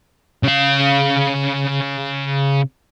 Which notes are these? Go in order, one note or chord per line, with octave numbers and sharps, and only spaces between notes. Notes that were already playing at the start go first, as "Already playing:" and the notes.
C#3 F5